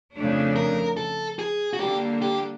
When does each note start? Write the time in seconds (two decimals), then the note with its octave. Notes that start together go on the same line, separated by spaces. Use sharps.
0.14 F2 C#3 F3 A3 D4
0.56 A#4
0.97 A4
1.39 G#4
1.73 F#4
1.80 D3 G3 A#3 G4
2.22 G4